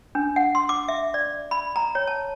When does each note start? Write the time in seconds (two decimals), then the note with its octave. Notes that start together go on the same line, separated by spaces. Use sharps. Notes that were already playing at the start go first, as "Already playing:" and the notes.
0.15 D4
0.36 F#5
0.55 C6
0.69 D6
0.88 E5
1.14 D5
1.51 B5
1.76 A#5
1.95 C#5
2.07 A5